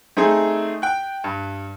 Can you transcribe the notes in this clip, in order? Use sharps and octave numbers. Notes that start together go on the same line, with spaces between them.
A3 C4 D#4 G#4
G5 F#6
G2